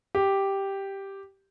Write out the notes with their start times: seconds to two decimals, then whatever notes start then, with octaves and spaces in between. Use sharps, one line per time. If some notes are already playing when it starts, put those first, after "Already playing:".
0.15 G4